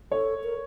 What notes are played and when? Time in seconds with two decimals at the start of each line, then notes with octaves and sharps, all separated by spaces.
0.11 A4 C#5
0.44 A#4